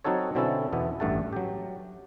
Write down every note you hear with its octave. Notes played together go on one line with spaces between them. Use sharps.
F#3 C4 D#4 F#4 A4 C#5
B2 D3 C4 C#4 E4 A4
E2 B2 B3 E5
A1 G2 A3 F#5 A5
F#3 G4